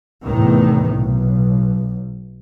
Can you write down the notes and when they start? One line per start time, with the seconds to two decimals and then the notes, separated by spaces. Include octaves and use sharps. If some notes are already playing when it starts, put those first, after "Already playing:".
0.24 E2 A2 C3 D#3
0.95 B1